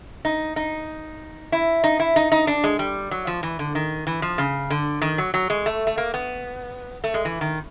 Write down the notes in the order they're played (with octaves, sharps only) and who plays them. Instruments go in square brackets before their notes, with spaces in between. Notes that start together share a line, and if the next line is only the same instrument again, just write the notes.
[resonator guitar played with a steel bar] D#4
D#4
E4
D#4
E4
D#4
D#4
D4
G#3
G3
F#3
F3
E3
D3
D#3
E3
F3
C#3
D3
D#3
F#3
F#3
G#3
A3
A3
A#3
B3
A3
G#3
E3
D#3